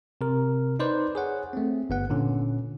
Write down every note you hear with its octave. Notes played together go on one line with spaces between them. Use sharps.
C3 A#4
D#4 B4 C5 D5
G#4 C#5 F#5
A3 C4
G1 B3 F#5
A#2 D3 C#4